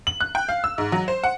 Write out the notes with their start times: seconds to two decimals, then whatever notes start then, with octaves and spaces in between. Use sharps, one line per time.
0.07 F#7
0.20 F#6
0.35 G5
0.49 F5
0.64 E6
0.78 G#2
0.92 F#3
1.08 C5
1.24 F#5